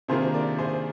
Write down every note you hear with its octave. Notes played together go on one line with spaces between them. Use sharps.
C3 D#3 A#3 D4 F4 G#4 C5
A#4 D5
G#4 C5